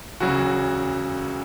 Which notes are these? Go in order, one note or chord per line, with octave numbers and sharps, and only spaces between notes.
E1 D2 C#3 F#3 F#4